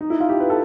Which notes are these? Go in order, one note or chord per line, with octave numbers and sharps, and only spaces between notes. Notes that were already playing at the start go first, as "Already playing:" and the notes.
D#4
E4
F4
G4
B4
A4